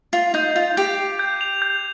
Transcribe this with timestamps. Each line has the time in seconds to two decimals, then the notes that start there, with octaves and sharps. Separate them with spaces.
0.13 F4 C7
0.34 D#4 G6
0.55 F4 F7
0.77 G4 G6
0.98 C7
1.19 G6
1.41 F7
1.62 G6